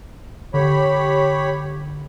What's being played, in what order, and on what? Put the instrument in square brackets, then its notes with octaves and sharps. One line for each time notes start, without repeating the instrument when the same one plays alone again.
[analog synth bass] D3 [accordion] G4 C#5 B5